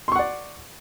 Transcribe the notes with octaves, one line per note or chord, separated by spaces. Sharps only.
D5 F#5 C6 C#6